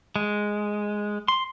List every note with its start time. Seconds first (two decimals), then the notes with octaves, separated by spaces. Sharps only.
0.16 G#3
1.28 C6